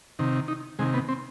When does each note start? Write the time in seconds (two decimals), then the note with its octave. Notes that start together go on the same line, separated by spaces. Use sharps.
0.19 C3 D#3
0.48 D#4
0.79 C3 D#3 G#3
0.94 B3
1.09 C4